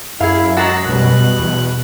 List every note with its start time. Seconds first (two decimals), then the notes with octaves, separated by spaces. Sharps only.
0.21 F#2 E4 G#4 F5
0.57 F#3 G#3 F#4 A5 E6 F#6
0.85 B2 G3 F#6
1.39 E2